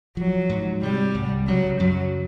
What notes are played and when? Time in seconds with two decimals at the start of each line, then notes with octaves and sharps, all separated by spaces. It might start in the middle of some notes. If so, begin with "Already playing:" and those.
0.17 F3 F#3
0.49 G#2
0.83 C3 G3
1.14 C2
1.47 C#3 F#3
1.80 F#2 F#3